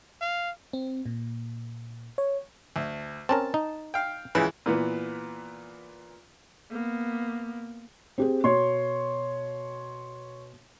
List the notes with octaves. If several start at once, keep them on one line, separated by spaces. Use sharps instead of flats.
F5
C4
A#2
C#5
D2
C4 C#4 A#4 A5
D#4
F5 G5
C#2 C#3 E3 B4
A#2 E3 B3
A#3 B3
C4 G4 G#4
B2 C#5 C6